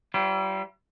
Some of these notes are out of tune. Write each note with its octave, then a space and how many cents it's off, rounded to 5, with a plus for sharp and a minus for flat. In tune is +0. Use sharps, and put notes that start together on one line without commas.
G3 -35 E4 +45 C5 +0